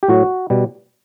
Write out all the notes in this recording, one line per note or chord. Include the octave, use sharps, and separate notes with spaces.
G4
A2 F#3 F#4
B2 G3